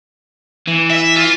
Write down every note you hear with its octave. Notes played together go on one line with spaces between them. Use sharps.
E3
E5
F4